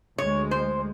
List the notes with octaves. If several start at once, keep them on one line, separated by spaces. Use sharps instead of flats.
D2 G#3 C#5
C5